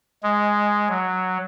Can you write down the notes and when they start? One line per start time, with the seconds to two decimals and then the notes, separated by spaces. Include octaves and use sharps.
0.23 G#3
0.89 F#3